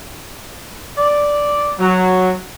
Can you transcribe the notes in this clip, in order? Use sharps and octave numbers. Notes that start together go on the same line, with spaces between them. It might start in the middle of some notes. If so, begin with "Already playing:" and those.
D5
F#3